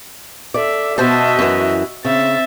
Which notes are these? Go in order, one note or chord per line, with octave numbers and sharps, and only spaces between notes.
A4 D5 E5
B2 F#4 C5 D#5 E5 A5
F#2 E3
C#3 C4 E5 A6